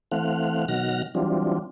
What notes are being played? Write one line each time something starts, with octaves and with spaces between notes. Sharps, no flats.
E3 A3 C4 F5 F#5
B2 D#3 F#3 F#5 F6 A#6
E3 F#3 G3 C4 D4 F4